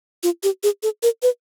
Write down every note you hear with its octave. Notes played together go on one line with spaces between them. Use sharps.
F4
G4
G#4
A4
A#4
B4